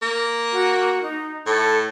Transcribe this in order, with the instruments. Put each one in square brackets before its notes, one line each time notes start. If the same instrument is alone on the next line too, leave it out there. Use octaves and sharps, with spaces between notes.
[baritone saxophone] A#3
[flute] F#4
D#4
[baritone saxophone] A2 [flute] A4